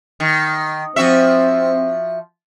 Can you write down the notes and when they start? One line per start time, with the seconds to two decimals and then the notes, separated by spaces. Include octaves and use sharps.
0.20 D#3
0.96 F3 C4 F#4 E5